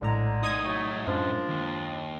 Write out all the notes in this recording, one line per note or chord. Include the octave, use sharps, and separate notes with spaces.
A#1 A2 D3 G#3 A#5
A2 D#4 D#6 G#6 D#7
F#3 A3
F#2 F3 G#3 D4
D#2